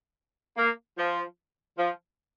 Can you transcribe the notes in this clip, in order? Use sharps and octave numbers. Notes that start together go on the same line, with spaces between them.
A#3
F3
F3